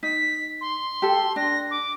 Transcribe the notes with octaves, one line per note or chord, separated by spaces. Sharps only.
D#4 B6
C6
G4 A4
D4 A#6
D6